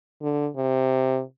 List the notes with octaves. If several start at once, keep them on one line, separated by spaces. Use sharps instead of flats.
D3
C3